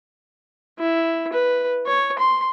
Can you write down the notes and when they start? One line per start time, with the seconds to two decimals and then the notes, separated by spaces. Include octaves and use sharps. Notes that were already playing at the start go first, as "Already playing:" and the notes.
0.79 E4
1.33 B4
1.87 C#5
2.19 C6